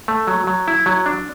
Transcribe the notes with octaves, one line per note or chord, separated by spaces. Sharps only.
A3
F#3
F#3
E4
F#3
D4